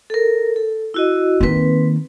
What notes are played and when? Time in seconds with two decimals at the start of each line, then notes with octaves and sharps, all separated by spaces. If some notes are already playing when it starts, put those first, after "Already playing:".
0.10 A4 A#4
0.56 A4
0.94 E4 F#4 D#5
1.41 D#3 A#3 C4 B4